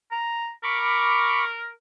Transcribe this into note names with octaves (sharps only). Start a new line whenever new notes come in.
A#5
A#4 B5 C#6 D6